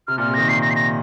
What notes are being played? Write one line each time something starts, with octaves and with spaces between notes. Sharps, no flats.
C3 F6
A#2 F6
C3
D#3 A#6
A#2 C7
A#6
C7
A#6